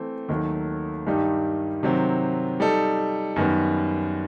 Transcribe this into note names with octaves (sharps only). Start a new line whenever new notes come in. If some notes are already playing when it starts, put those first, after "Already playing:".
Already playing: E3 A3 C4
D#2 D#3 F#3 A3
G2 D#3 G3 D#4 G4
C3 D#3 F#3 C4
G3 D#4 A4
F#2 D#3 G3 B3